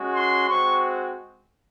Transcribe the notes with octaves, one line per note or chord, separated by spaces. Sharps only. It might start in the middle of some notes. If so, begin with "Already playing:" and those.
Already playing: G#3 C#4 F#4
C6
G#3 C4 F#4 C#6